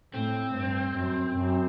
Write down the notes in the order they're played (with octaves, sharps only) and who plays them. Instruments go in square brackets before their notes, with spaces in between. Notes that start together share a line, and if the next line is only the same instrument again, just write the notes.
[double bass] A2 [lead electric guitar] C4
[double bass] G2
F#2
F#2